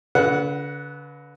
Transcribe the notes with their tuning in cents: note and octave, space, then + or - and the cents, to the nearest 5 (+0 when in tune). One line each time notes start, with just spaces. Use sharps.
D3 -45 B4 -20 F#5 +5